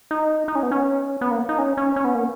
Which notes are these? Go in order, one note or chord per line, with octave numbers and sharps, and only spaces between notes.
D#4
D#4
C#4
B3
C#4
B3
A#3
D#4
C#4
C#4
C#4
B3
A#3